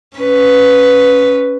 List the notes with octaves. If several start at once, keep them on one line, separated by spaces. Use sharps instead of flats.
C#4 B4